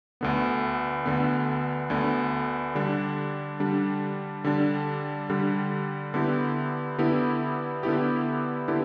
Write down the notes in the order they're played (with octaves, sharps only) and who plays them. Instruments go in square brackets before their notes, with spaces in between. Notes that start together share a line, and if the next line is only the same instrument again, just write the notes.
[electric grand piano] D2 D3 B3
D2 D3 B3
D2 D3 B3
D3 G3 D4
D3 G3 D4
D3 G3 D4
D3 G3 D4
D3 B3 E4 G4
D3 B3 E4 G4
D3 B3 E4 G4
D3 B3 E4 G4